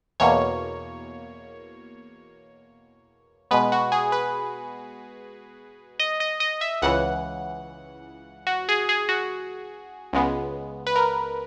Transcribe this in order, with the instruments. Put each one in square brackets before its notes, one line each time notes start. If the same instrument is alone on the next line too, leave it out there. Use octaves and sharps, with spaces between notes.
[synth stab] E2 B2 A#3 C#5
B2 G#3 B3 B4
F#4
G#4
B4
D#5
D#5
D#5
E5
C#2 C#3 E3 F#5
F#4
G#4
G#4
F#4
C#2 C#3 G#3 B3
B4
A#4